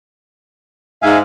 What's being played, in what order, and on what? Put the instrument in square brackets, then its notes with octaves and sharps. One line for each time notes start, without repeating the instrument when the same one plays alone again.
[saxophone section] G#2 [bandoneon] E5 F5 G#5